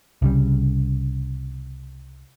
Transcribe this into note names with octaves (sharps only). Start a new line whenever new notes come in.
C2 C#3 G3